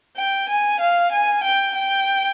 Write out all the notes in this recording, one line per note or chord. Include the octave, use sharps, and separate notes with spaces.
G5
G#5
F5
G#5
G5
G5